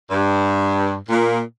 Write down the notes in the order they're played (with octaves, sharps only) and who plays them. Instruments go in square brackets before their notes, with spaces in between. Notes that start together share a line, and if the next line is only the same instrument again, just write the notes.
[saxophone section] G2
A#2